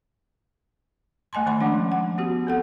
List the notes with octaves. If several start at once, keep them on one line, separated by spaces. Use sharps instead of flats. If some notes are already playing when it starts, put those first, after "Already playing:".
A3 D#5 G#5 A5 C6
D#3 A3 B5 C6
F3 G#3 C#4 D4 F#5
F#5
B3 F#4 G4
C4 A4 F#5